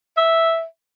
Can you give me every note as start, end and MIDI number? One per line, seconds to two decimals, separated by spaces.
0.17 0.64 76